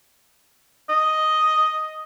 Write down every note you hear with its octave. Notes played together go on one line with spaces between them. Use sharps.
D#5